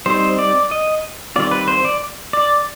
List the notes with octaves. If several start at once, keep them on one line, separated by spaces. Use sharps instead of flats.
G3 C4 D#4 C5
D5
D#5
D#3 G3 C4 F4 D5
B4
C5
D5
D5